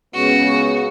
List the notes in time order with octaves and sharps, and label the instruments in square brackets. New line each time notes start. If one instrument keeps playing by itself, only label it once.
[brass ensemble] C#2 C#3 B3 [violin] F#4